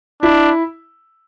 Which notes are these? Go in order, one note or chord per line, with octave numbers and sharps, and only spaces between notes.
D4 E4